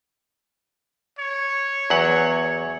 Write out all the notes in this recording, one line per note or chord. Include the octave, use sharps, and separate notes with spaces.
C#5
E2 F#3 F#5